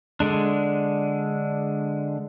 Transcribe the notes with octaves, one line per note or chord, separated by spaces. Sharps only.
D3 G#3 D4